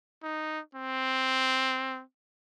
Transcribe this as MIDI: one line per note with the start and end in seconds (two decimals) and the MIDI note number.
0.23 0.60 63
0.75 2.02 60